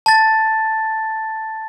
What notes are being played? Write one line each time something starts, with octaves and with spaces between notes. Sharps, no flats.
A5 A6